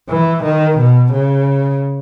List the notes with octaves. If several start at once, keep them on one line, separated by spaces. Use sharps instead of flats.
E3
D#3
B2
C#3